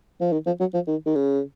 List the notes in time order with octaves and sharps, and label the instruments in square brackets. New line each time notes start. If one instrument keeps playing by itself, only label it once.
[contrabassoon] F3
D#3
F3
F#3
F3
D#3
D#3
C#3